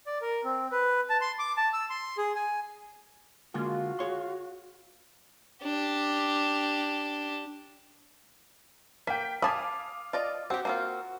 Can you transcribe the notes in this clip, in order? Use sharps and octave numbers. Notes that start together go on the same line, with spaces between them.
D5
A#4
C4
B4
A5
C6
D6
A5
E6
C6
G#4
G#5
D3 G#3 A#3 F4 F#4
G#4 C#5 C6
D4 G4
A#3 G5 B6
F5 G#5 A5 B5 D6 D#6
F4 D5 D#5
C4 F#4 G4
A#3 C4 F4